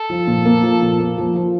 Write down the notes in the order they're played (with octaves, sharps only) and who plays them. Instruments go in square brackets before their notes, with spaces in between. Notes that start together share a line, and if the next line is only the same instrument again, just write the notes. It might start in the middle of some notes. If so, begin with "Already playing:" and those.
Already playing: [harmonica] A4
[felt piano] F3
A#2
A#3
F3
A#2
A#3
F3
F3